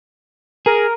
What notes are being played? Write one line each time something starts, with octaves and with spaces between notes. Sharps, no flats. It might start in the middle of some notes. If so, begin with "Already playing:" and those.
G#4 A#4